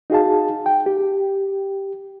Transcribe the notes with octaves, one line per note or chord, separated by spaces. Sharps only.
D#4 F#4 G#4 F5 A5
G5
G4